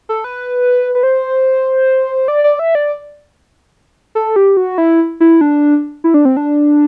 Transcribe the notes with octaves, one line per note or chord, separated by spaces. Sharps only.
A4
B4
B4
C5
D5
D5
E5
D5
A4
G4
F#4
E4
E4
D4
E4
D4
C4
D4